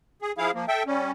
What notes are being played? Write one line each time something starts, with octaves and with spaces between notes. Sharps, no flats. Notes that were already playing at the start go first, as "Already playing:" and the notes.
G#4
F3 E4 G#4 F5
F3 A#3
A4 E5 G5
G3 C#4